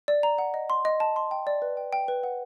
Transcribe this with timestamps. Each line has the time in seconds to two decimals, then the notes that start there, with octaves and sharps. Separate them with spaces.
0.08 D5
0.23 A#5
0.38 F#5
0.54 D#5
0.70 C6
0.85 D#5
1.00 A5
1.16 C6
1.31 G5
1.47 D5
1.62 B4
1.77 G5
1.93 G5
2.08 B4
2.23 F#5